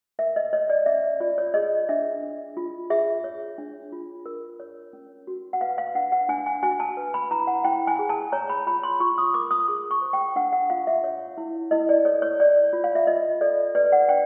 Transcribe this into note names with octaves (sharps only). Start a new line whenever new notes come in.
A#4 E5
D#5
C#5 D#5
D5
C#4 E5
E5
F4 D5
C#5
G#4 D#5
D4 E5
D4
F4
G#4 E5
C#5
D4
F4
A#4
C#5
C#4
F#4
F#5
B4 F5
F5
D4 F#5
F#5
D4 G#5
G#5
F#4 G#5
A5
B4
B5
E4 A#5
F#5
E4 G5
G#5
G#4
A5
C#5 A#5
B5
F4 B5
C6
F4 C#6
D#6
A#4 D6
D#6
G#4 D6
C#6
C5
G5
D4 F#5
F#5
F4 F5
E5
C#5
E4
E4 D#5
D5
A4 C#5
C#5
C#5 D5
F4
F5
E5
F4 D#5
A4 D5
B4 D5
F#5
D4 G5